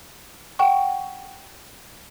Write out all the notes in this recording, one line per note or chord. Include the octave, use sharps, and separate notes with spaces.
F#5 G5 C#6